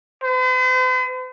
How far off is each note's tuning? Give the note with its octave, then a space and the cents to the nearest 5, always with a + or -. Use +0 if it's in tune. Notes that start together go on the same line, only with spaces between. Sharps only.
C5 -45